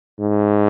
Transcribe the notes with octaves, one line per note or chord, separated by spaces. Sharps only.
G#2